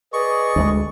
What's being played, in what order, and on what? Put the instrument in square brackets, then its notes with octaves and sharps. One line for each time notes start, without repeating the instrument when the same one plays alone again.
[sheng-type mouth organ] G#4 D5 D#5 [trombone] B4 [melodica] C#6
[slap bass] D2 F#3 G#3